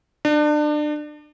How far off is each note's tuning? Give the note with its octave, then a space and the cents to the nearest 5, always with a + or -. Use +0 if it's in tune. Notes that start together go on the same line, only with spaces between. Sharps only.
D4 +30